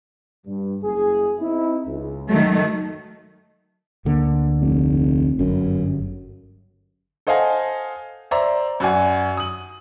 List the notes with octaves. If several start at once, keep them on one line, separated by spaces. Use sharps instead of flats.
G2
F#1 G#4
C4 D#4 E4
C#2
D#3 F#3 A3
D2 D3 A#3
F1
G1 F#2
A4 C5 D#5 F5 F#5 G#5
C5 D5 E5 A#5
F#2 F#4 D5 G#5
D#6 F#7